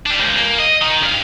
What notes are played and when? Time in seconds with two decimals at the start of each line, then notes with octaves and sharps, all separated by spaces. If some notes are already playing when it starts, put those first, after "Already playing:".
0.06 G3 D4
0.19 C#2
0.36 A#3
0.59 D#5
0.82 D#3
1.03 G2 F5